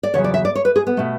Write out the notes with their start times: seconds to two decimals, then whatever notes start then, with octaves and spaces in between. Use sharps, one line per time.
0.03 D5
0.14 E2 C#3 F#3 C#5
0.24 D5
0.34 E5
0.45 D5
0.55 C#5
0.65 B4
0.76 G#4
0.87 B3
0.97 B2 A3